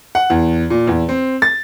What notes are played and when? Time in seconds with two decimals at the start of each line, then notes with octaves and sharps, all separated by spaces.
0.15 F#5
0.30 E2
0.70 A#2
0.87 E2
1.09 C4
1.42 A6